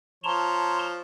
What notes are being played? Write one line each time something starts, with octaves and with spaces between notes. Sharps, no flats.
F3 C#5 A5 A#5 C6